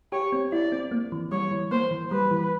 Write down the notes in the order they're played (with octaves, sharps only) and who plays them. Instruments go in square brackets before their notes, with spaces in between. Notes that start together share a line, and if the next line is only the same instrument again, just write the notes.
[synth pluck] G4 [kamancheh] C#5
[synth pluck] C4
[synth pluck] E4 [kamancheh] D5
[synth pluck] C4
A#3
E3
[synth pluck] G3 [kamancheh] C#5
[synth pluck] E3
[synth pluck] A#3 [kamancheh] C5
[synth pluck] E3
[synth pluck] G3 [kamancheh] B4
[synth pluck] E3